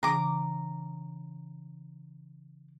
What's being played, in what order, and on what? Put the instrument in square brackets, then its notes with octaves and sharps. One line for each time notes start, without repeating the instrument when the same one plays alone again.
[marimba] C#3 E3 D4 [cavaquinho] A#5 D6